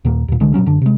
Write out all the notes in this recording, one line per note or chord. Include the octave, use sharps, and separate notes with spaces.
D#2 A#2 A#3
D#2 A#2
C2 D3 G#3
A#2 F3 F#3 C#4
F#2 D3 D4
C3 G#3